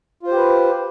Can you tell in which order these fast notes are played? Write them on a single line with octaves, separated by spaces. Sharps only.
F4 C5 G4 B4